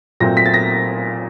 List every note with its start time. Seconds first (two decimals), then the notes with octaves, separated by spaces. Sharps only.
0.20 A#2 F#3 A3 C4 A#6
0.37 B6
0.46 A6
0.54 A#6